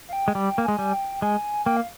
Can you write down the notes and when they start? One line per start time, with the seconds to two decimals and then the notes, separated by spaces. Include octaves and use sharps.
0.09 F5
0.13 G5
0.28 G#3
0.34 G3 G5
0.58 A#3
0.65 G#3 G#5
0.79 G3
0.93 G5
1.22 G#3 G#5
1.66 A#3 G5
1.77 F5